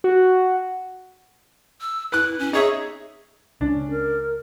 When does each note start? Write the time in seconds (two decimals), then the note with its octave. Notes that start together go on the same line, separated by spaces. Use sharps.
0.04 F#4
1.81 E6
2.12 E4 B4 F#6
2.39 C#4
2.53 D#4 G#4 C#5 E5
3.61 C#2 C#4 D4
3.91 A#4